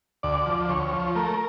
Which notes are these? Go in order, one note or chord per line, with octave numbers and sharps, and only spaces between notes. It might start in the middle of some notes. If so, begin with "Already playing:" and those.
D2 D5
F3
D5
D2 C#5
F3
A3 A#4